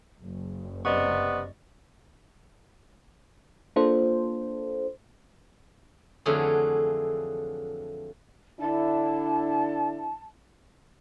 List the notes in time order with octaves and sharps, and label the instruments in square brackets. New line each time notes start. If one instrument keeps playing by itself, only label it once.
[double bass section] F#1
[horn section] C3 B3 [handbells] D5 D#5 C#6
[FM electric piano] A#3 D4 F4 A4 C5
[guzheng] F2 D3 E3 F#3 A3 G#4
[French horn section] D3 D4 E4 [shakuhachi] A5